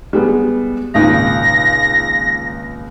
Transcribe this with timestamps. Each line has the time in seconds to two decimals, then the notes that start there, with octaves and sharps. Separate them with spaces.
0.13 G3 G#3 B3
0.94 G#1 C#2 A#2 A#6